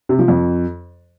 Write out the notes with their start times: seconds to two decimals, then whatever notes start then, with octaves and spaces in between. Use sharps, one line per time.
0.09 C3
0.19 F3
0.28 F2